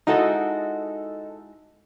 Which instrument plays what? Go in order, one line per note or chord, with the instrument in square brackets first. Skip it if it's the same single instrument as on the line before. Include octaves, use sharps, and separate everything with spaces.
[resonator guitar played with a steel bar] G#3 E4 F#4 [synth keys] D#4 A4